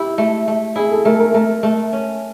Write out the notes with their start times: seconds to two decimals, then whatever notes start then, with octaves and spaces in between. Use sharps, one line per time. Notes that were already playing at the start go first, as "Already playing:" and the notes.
Already playing: E4 G4
0.18 A3
0.48 A3
0.76 E4 G#4
0.91 A4
1.05 A3 A#4
1.20 A#4
1.34 A3 A#4
1.63 A3
1.93 C#4